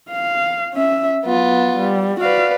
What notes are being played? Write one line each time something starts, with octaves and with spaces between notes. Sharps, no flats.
F5
C#4 E5
F#3 B3 F4
G3
F#4 B4 D5 F5